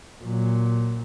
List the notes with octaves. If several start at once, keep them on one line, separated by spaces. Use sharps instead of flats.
A#2 F#3